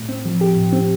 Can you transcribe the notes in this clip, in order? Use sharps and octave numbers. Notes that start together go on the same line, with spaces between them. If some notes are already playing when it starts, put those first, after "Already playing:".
Already playing: A2
C4
F3
G4
A2
C4